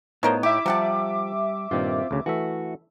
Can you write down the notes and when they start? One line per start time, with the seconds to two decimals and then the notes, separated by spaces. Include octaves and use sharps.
0.23 A2 F3 B3 D#4 A#4 C5 C#5
0.43 E4 G4 E5 D6
0.66 C3 F3 G3 G4 F#5 A5
1.71 G2 A#2 D#3 C4 F4
2.11 D2 C#3
2.26 E3 A3 F#4 E5